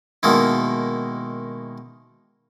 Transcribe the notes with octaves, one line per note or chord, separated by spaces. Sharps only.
B2 D#3 G#3 A#3 E4